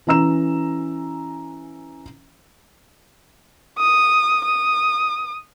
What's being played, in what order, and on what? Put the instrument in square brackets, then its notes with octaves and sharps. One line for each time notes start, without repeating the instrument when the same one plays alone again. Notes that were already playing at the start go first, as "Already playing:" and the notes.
[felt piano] E3 C#4 A#5 E6 E7
[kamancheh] D#6
D#6